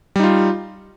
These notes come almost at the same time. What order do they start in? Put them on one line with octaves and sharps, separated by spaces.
G3 D#4 F4